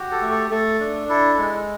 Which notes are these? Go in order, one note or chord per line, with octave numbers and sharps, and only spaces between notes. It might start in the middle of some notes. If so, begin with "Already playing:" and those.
Already playing: F#4 G4
A4
A3
A4
A3 A4
D4
E4 A4
G#3